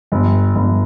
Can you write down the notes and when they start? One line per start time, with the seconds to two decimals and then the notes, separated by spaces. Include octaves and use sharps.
0.12 G1
0.55 G1